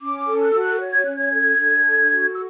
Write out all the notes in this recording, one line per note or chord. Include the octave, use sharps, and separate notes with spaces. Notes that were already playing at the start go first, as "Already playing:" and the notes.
C#4 D6
A4
F#6
F#4 E6
F#6
C#5
G#6
C#4 F#6
G#6
A4
D4
A4
F#4
E6